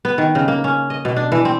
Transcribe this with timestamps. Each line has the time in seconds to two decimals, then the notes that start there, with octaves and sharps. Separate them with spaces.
0.05 B3
0.18 D#3
0.35 C#3
0.48 A#3
0.64 C#4
0.90 D#5
1.05 B2
1.16 D4
1.32 E3
1.45 C4